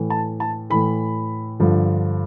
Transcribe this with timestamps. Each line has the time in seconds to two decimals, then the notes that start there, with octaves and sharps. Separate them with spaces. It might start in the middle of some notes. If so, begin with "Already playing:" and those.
Already playing: A2 E3
0.10 A5
0.40 A5
0.70 A2 E3 B5
1.60 G2 D3 F3